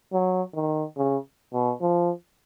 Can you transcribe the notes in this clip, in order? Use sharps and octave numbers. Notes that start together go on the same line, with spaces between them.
F#3
D#3
C#3
B2
F3